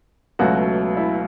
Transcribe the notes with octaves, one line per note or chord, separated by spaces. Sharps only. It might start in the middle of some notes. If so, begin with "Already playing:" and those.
C#2 B2 F#3 A3 F#4
E4